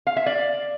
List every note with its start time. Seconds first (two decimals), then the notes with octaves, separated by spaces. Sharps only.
0.07 F5
0.16 E5
0.26 D5